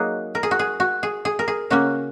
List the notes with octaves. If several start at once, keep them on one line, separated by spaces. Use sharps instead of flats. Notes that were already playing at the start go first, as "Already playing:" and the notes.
Already playing: F#3 A#3 D#4 F#4 G#4
A#4
G#4
F#4
G#4
F#4
G#4
G#4
A#4
G#4
C#3 A#3 C#4 F#4